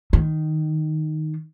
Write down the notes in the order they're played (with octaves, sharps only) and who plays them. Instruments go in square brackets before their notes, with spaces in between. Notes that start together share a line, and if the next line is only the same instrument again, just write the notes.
[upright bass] D#3